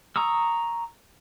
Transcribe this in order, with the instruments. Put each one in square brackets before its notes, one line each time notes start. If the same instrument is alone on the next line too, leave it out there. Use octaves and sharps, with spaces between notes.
[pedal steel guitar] A#5 C#6 D#6 E6